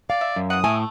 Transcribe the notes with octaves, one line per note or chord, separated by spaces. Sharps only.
D5 F5
E5
F#2
E3 F#5 D#6
A2 A3 G#5